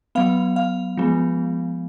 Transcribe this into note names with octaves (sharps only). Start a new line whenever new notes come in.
F#3 B3 F5
F5
F3 G#3 B3